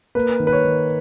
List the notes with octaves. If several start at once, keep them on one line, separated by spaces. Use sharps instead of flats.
A#3 B4
D#3
B4
C#5
D#3